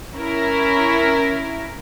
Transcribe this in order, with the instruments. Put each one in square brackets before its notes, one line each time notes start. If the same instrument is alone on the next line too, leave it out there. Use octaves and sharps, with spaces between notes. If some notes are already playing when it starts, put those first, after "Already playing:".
[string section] C#4 E4 A#4